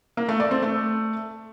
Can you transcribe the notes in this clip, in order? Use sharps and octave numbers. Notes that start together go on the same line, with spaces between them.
A#3
A3
D5
C4
A3